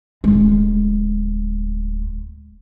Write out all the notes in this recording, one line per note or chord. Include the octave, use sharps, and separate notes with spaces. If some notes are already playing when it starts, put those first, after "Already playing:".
D1 G#3